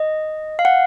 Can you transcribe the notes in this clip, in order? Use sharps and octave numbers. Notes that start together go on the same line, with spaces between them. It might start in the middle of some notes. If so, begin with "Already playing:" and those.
Already playing: D#5
F5
F#5